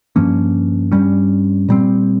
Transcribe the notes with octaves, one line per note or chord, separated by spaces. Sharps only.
G2 F3 A#3 C#4
G2 G3 C#4
A#2 G3 C4